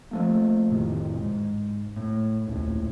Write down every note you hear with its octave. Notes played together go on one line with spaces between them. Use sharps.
F3 A3 A#3
F1 A2 C3 D#3
G#2
A2
D#1 C2 A2